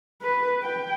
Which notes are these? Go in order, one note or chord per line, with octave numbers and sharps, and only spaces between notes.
B4
G5